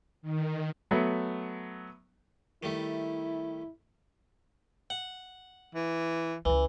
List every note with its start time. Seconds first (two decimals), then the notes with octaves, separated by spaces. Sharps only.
0.22 D#3
0.91 F#3 A3 B3
2.63 D#3 G3 A3 E4
4.90 F#5
5.75 E3
6.45 C#2 C#3 E3